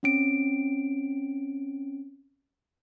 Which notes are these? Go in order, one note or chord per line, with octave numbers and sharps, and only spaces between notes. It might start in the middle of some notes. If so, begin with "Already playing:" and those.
C4 C#4 D7